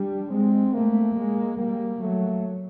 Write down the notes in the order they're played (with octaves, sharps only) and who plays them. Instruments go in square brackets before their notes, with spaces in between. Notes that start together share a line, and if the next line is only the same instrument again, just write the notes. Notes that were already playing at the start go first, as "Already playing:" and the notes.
Already playing: [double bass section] G3 [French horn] D4
[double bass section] G#3 [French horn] C4
[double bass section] A3 [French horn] A#3
[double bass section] G#3
[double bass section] G3 [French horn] A#3
[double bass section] F#3 [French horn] A3